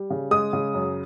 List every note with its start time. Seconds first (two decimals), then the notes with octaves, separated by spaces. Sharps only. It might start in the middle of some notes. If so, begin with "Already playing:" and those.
Already playing: G3
0.10 C#3
0.31 G#3 D#6
0.53 C#3
0.74 F#2